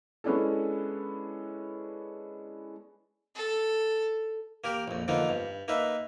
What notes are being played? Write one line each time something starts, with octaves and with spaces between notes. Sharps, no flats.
G#3 B3 C#4 D4 E4 A4
A4
A#3 G4 A#4
A#1 F2
D3 F3 A#3 B3 D#4
G2
A#3 D#4 B4 E5